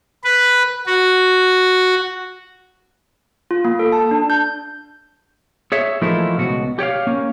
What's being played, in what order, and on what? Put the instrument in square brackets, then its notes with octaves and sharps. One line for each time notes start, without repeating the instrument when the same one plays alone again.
[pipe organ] B4
F#4
[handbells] F4
A#3
A4
A5
D4
G6
[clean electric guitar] G#4 C#5 E5
E3 F3 A3 A#3 D#4 E4
C#2 B2 F#4
G4 C#5 D5 F5
A#3 C#4